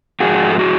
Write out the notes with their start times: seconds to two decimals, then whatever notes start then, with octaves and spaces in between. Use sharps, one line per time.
0.20 G#2 F3 F#4 G#4
0.50 A4
0.59 F#4 G#4